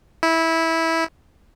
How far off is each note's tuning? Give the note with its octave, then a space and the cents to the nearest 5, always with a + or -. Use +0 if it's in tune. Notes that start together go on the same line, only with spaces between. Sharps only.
E4 -15